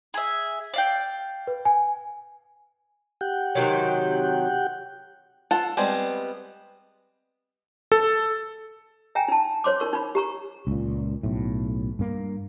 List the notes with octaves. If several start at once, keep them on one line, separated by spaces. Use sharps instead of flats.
G#4 E5
D5 F5 G5
B4
G#5
G4 F#5 G5
C3 D#3 F#3
F4 A4 F#5
G3 G#3 B3 C4 C5
A4
E5 G5 G#5 A#5
D#4 A5
C5 C#5 C6 D6
D#4 A#4 C#6
D#4 B5
G4 A#5 C#6
C#2 A#2
B1 A2
G2 A#3